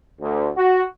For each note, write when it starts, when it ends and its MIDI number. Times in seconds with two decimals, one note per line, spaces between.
0.21 0.49 38
0.57 0.82 66